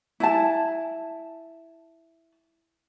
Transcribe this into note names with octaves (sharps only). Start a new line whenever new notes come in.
E4 G#5 A5